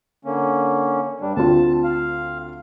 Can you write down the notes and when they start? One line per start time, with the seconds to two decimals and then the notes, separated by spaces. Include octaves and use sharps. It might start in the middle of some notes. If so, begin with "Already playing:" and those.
0.25 D3 A#3 C#4
1.21 G2 G3 D4
1.36 D2 C4 F4 A5
1.84 F5